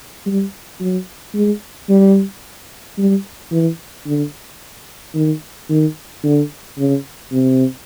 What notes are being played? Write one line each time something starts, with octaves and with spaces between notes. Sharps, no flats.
G3
F#3
G#3
G3
G3
E3
D3
D#3
D#3
D3
C#3
C3